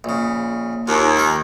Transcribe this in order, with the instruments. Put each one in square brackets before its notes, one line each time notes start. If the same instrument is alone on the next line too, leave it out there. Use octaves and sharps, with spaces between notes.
[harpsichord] A#1 C#3
[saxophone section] D#2 [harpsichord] F4
[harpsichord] D#3 A#4